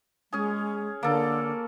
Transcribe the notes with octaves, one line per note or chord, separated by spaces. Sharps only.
G#3 C#4 G#4
D3 A#3 A4